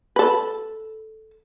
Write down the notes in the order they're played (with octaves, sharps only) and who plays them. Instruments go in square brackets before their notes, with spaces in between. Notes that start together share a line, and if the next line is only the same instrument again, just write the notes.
[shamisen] A4 B4